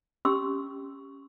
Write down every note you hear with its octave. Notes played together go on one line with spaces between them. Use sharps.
C#4 G4 C6 E6